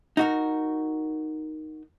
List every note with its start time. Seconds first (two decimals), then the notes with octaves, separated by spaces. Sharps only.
0.17 D#4 F#4 A#4